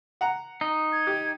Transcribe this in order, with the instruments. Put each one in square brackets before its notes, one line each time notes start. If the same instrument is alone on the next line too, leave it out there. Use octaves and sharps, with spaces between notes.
[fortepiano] F#5 A#5
[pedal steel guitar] D#4
[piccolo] G#6
[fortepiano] G4